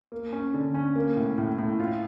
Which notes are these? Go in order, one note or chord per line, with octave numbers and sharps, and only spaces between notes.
A#3
C#4
D3
C#4
A#3
A2
A2
A2
F4